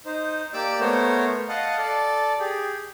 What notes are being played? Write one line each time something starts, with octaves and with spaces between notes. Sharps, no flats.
D#4 C5
A#3 G4 D5 D6 E6
A3 B3 A#4 C5 C#5
D#5 F5 F#5 A5
A4 D5
G4 G#4